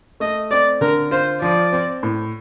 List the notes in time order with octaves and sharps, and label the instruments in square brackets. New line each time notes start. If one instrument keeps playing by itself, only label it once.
[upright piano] A3 [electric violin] D#5
[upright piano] C4 [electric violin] D5
[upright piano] D3 [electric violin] A#4
[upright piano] F4 [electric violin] C5
[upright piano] F3 [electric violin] D5
[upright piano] C4
A2